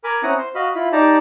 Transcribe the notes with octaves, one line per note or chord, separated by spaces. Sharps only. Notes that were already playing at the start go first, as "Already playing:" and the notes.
A#4 G#5 B5 D6
C4 C#4 E4 F#5 A#5 D#6
C5
F#4 D#5 F5 B5
E4 F4 B5
D#4 G4 D5 A5 A#5